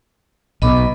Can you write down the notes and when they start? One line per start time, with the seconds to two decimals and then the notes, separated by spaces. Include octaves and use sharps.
0.62 B1 B2 D#5 B5 D6